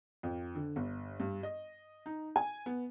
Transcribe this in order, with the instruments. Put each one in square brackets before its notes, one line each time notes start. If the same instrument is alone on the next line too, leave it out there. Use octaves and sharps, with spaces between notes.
[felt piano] F2
D3
G1
G2
D#5
D#4
G#5
B3